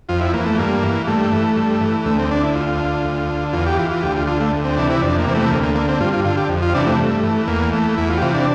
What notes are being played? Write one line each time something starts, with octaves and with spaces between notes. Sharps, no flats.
F2 F4
E4
E3 A#3
A3
G2 A#3
E3
G2 A3
E3
G2
E3
D2 A3
C4
D3 D4
E4
D2 F4
D3
D2
D3
E2 F4
G4
E3 F4
F4
D2 G4
F4
D3 F4
A3
D2
C4
C3 E3 D4
E4
F2 D4
A#3
C3 E3
A3
D2 A#3
A#3
D3 A#3
C4
G2 F4
F4
D3 F4
G4
F2
F4
C3 E3 D4
A3
G2
E3
E2 A#3
E3 A3
E2 E4
F4
G4
C3 E3 F4
D4